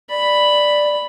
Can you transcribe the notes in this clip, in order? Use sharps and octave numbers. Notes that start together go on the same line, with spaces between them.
D5 B5